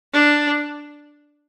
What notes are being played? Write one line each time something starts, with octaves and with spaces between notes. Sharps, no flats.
D4